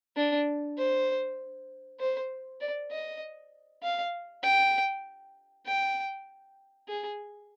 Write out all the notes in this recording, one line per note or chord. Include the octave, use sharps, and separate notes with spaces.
D4
C5
C5
D5
D#5
F5
G5
G5
G#4